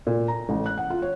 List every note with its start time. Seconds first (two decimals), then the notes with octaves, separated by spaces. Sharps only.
0.07 A#2
0.28 A#5
0.49 A1
0.66 F#6
0.78 F#5
0.90 F4
1.02 C#5